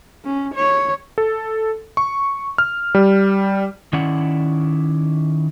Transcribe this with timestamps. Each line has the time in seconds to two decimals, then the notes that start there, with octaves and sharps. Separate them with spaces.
0.25 C#4
0.55 C#5
1.18 A4
1.97 C#6
2.58 F6
2.95 G3
3.93 D#3 C#4 E4 D5 F#5